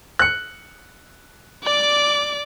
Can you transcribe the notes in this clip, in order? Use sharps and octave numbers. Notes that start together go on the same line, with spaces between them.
F#6 C#7
D5 D6